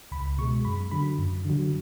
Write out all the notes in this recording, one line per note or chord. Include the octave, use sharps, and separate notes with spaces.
C#2 B5
B2 G#3 C#6
F#2 B5
D3 F#3 B5
F#2
D3 F#3